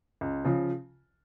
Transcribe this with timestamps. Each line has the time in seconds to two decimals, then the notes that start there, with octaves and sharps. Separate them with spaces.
0.21 C#2
0.45 C#3 F3